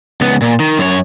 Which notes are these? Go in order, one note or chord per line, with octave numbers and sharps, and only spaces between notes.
C#2 B3
A#2
D#3
F#2 C#5